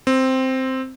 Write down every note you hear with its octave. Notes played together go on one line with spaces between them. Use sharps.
C4